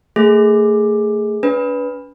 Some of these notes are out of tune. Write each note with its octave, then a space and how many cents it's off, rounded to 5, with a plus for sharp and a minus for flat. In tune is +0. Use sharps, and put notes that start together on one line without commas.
A3 +35 G#4 +0
D4 -45 B4 +0